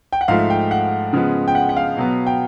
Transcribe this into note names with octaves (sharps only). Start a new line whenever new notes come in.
G5
F#5
G#2 F3 A3 F5
G5
F#5
C#3 F3 G#3 B3
G5
F#5
F#5
F5
B2 F#3 B3
G5